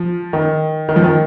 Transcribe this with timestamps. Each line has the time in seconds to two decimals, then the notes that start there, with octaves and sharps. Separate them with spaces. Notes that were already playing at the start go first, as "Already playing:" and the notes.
Already playing: F3
0.33 D#3
0.89 D#3
0.96 F3
1.04 D#3